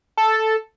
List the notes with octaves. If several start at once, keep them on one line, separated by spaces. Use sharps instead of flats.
A4